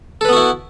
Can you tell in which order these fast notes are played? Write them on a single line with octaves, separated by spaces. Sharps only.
A4 B4 B3 F#4 E4